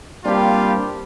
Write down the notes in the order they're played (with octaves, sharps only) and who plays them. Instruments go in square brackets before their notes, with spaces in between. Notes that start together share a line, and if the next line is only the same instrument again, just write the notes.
[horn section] G3 A#3 C4 D4 F4 G4